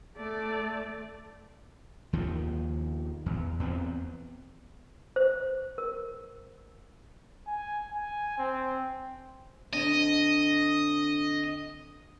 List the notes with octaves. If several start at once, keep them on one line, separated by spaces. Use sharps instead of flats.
A3 D5
D#2 D#3 F3
E2
E2 B3 C4
C5
A#4
G#5
G#5
C4
D3 C4 D4 D#5